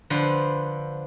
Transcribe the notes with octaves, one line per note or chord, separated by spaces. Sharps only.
D3 F3 B4 C5